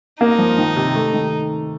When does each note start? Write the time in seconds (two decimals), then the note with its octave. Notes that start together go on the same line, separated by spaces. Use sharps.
0.20 A#3 D#4
0.39 F3
0.58 D#3
0.76 C3
0.95 A3
1.13 D#3